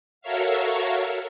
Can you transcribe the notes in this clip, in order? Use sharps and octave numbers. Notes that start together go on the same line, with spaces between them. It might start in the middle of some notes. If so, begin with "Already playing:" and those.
F#4 A4 A#4 C#5 E5 F5